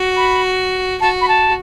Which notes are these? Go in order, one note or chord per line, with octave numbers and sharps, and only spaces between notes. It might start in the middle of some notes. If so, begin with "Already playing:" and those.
Already playing: F#4
B5
F#4 A5
B5
A5